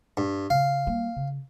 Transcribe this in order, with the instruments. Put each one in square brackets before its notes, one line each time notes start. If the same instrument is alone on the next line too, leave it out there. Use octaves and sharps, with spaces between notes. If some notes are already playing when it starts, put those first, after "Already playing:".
[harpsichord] G2
[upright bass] C#3 [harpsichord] F5
[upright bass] G3 A#3
C#3